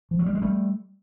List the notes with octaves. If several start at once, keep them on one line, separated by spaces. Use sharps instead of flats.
F3
F#3
G3
G#3
G3 A3